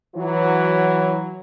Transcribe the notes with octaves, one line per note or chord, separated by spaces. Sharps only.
E3 F#3